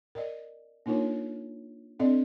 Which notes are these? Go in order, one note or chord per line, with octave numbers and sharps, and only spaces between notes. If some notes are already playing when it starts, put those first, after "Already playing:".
A#4 D5 D#5
A#3 D4 D#4 F4 A#4 C#5
C4 D4 A4 D5 D#5